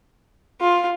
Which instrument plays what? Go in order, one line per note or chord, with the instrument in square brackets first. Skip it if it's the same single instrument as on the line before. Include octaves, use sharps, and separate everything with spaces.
[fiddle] F4